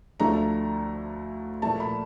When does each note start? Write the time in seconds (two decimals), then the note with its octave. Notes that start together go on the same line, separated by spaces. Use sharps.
0.20 D2 D3 F3 A3 A#5
1.62 A#2 F3 A3 A5
1.80 B5